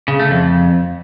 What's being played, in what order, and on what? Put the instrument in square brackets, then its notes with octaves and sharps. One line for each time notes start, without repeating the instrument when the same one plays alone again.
[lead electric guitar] C#3
A3
F2